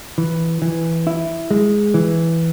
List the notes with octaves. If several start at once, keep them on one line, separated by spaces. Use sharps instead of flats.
E3
E3
E4
G#3
E3